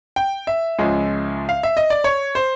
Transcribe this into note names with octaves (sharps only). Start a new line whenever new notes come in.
G5
E5
C#2 C#3 F3 G#3 C#4
F5
E5
D#5
D5
C#5
C5